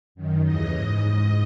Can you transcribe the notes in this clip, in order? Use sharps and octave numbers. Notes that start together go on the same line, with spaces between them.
F#2 D#3
D#2 C#3 E3 D#5
G#2